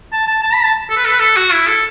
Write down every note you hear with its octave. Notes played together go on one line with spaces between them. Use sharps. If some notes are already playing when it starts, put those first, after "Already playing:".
A5
A5
A5
B5
A5
A4
B4
A4
B4
A4
F#4
E4
A4